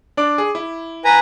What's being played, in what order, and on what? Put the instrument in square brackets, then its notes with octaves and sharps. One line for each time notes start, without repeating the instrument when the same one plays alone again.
[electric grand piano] D4 D5 D6
G#4
E4
[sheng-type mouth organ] B4 G#5 A#5